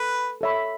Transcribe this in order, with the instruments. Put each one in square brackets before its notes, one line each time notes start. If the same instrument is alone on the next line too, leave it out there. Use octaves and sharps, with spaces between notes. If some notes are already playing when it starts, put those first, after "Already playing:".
Already playing: [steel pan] A4 [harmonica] B4
[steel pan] A4 C#5 E5 B5